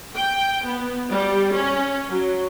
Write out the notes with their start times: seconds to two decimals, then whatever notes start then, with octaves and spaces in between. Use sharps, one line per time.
0.16 G5
0.65 B3
1.11 G3
1.54 C#4
2.10 F#3